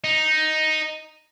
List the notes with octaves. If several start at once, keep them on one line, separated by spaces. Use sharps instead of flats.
D#4